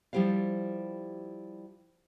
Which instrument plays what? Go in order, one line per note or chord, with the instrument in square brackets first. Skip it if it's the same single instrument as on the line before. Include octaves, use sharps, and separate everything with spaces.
[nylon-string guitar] F3 G3 E4 G4 C5 F5